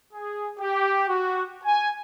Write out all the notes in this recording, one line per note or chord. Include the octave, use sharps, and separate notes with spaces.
G#4
G4
F#4
G#5